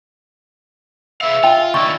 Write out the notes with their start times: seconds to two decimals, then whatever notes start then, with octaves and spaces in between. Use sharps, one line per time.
1.21 G#4 B4 E5 F5
1.44 F4 G5
1.74 D#3 D4 E4 F4 C#6